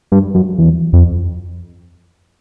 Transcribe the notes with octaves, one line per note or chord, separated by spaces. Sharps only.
G2
F#2
E2
F2